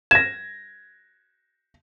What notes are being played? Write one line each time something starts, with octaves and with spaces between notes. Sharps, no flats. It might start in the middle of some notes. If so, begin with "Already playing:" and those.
G#6 A#6 E7